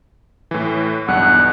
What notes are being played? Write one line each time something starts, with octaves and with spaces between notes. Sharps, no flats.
A2 E3
B1 E2 G2 F#5